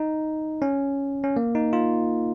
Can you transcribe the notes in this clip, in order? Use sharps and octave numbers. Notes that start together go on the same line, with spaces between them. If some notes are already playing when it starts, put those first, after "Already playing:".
Already playing: D#4
C#4
C#4
A#3
D#4
F4